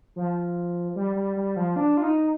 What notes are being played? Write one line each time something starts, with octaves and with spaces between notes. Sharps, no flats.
F3
G3
G3
G3
F3
D4
F4
D#4